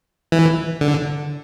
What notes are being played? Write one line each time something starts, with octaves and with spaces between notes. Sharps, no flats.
E3
D3